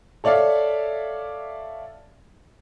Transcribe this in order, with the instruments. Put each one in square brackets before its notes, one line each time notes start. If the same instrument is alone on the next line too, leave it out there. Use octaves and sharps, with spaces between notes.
[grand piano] A4 C#5 D5 E5 F5